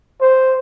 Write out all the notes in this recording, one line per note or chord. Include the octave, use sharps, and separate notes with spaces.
C5